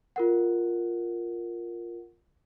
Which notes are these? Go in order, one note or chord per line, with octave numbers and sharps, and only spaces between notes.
F4 A#4 F#5